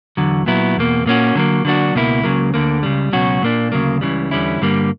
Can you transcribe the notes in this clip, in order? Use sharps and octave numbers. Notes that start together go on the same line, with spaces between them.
E2 D3 F#3
A#2 F#3 B3 E4
E2 B2 A#3
A#2 A#3 C#4 F#4
D3 F#3 A#3
D3 F#3 A#3 D4 F#4
C#2 B2 A#3 E4
C#2 C#3 F#3 A#3
D2 D3 A#3
C#2 C#3 G3
C#2 B2 F#3 C#4 F#4
A#2 A#3 D4
D2 C#3 F#3 A#3
C#2 C#3 E3 G3
E2 D3 G3 C#4 E4
G2 D3 G3 A#3